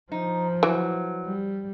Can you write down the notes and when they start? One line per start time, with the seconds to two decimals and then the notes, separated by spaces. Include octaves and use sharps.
0.12 F3 D#4
0.63 E3 F#3
1.25 G3